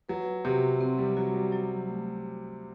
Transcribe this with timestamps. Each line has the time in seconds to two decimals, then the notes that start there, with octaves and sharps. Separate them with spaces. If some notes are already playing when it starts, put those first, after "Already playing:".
0.09 F#3 B4
0.45 C3 F#4
0.80 F#3 C4
0.98 G3
1.17 F#3 F#4
1.34 G3
1.52 F#3
1.88 A3